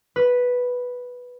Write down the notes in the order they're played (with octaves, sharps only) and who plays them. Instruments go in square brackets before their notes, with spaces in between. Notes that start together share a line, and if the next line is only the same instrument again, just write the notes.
[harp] B4